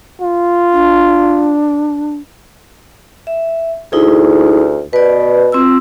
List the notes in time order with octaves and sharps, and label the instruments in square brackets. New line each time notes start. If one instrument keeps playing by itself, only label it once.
[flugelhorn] F4
[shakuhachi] D4
[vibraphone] E5
[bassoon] D2 [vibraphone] D#4 E4 G#4
[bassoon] B2 [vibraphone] B4 D5
[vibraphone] C4 F4 E6